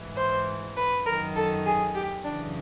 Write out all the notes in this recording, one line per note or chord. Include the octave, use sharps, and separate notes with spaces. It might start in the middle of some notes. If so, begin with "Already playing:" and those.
Already playing: G#2 E3
C5
B4
F#2 D#3 A#4
A4
G#4
G4
F#2 C#3 E3 D4